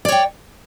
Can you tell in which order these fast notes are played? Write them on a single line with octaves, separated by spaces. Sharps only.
D5 C#5 G5